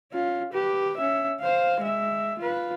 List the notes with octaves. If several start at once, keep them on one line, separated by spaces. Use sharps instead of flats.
C#4 F4
G4 B4
C#4 E5
C5 F5
G#3 E5
F4 B4